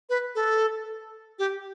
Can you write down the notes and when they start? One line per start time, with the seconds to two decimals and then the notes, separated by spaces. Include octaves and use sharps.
0.10 B4
0.35 A4
1.39 G4